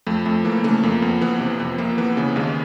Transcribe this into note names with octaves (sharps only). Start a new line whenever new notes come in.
F2 A3
F2 A3
E3 A#3
A#3
C#3 A3
F2 A#3
F2 B3
E3 B3
C3
F2 B3
F2 A#3
E3 B3
C#3
D#2 G#3